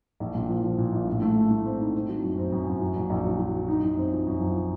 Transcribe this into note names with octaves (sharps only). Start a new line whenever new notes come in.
A#1
A#2
F3
F3
A#2
A#1
A2
A3
A2
A3
C4
D#4
C4
F#3
F#2
C4
F#2
F#2
F#3
A#1
A#1
F#3
F#3
F#3
D#4
F#2
C4
F3
F#2
F3